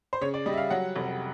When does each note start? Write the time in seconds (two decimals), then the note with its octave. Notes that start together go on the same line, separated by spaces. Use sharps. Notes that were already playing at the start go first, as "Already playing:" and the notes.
0.13 C5
0.21 C#3 C#5
0.34 D5
0.46 G3 D#5
0.53 E5
0.58 F5
0.70 F#3 F#5
0.96 F1